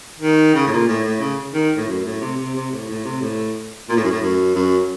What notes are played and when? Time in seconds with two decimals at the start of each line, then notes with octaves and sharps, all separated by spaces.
0.20 D#3
0.54 C#3
0.67 A2
0.70 A#2
0.87 A2
1.04 A2
1.20 C#3
1.54 D#3
1.77 A2
1.87 F#2
2.04 A2
2.20 C3
2.37 C3
2.55 C3
2.71 A2
2.88 A2
3.04 C3
3.21 A2
3.89 A#2
3.96 A2
4.04 F#2
4.10 A2
4.22 F#2
4.55 F#2